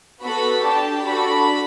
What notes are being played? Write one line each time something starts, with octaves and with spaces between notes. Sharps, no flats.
B3 F#4 A4 B5
D4 G4 A5
D4 F#4 A4 B5